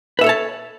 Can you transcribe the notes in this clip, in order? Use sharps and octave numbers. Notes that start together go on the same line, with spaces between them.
A4 B4 C#5 E5 A5